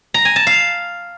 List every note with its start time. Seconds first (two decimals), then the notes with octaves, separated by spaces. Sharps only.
0.14 A#5
0.25 G#5
0.36 A5
0.47 F5